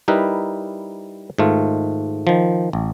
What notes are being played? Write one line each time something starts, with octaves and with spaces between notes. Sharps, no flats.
G3 D#4 E4 A#4 B4
G#2 D#3 A3 F4
D#3 F3
A1